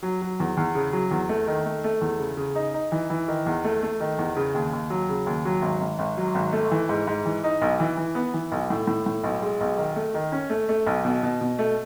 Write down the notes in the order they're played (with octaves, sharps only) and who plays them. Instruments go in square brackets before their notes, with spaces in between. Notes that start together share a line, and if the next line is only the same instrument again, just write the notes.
[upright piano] F#3
F#3
E2
E2
C#3
F#3
E2
A3
D#3
A3
A3
E2
C#3
C#3
D#4
D#4
E3
E3
D#3
E2
A3
A3
D#3
E2
C#3
D#2
D#2
F#3
C#3
D#2
F#3
G#1
G#1
G#1
F#3
G#1
A3
E3
G#2
G#2
E3
D#4
B1
E3
E3
B3
E3
B1
A2
A2
A2
B1
G#3
B1
D#3
A3
D#3
C#4
A3
A3
B1
B2
B2
B2
A3